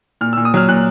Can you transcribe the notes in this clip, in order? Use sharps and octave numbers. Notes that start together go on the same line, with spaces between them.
A#2 F6
A#2 E6
D#6
F#3 F6
A#2 F#6